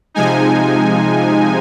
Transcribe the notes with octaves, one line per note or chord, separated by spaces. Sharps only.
C3 F3 G#3 D#4 G#5